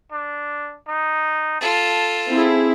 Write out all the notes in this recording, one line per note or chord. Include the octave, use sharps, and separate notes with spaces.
D4
D#4
F4 A4 A5
C4 E4 G#4